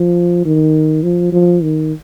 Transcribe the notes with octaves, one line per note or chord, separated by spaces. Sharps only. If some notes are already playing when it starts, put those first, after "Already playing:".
Already playing: F3
D#3
F3
F3
D#3